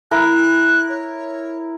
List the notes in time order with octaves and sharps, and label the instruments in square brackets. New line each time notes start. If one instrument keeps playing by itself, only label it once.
[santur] E4 A#4 [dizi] F#6
[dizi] C#5